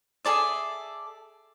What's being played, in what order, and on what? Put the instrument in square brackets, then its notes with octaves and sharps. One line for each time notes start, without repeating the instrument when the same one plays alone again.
[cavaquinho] G#4 A4 D5 E5